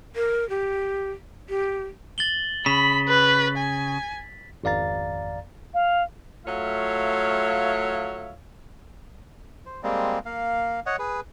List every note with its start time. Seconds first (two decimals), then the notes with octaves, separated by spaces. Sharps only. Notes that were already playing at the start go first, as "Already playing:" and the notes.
0.16 A#4
0.50 G4
1.49 G4
2.18 A6 F#7 G7
2.66 C#3 B5 B6
3.08 B4
3.58 G#5
4.63 G#1 F2 D5 F5 A#5 A6
5.74 F5
6.46 F#3 A3 F4 C#5 E5 F5
9.66 C5
9.83 G3 G#3 A#3 C4
10.25 A#3 F5
10.86 C#5 D#5 F#5
10.99 G#4 B4